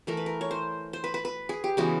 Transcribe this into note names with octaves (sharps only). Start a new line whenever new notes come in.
E3 A3 A#4
B4
A#4
C#5
C5
C5
B4
B4
B4
G#4
G4
C#3 E3 G#3 B3 F#4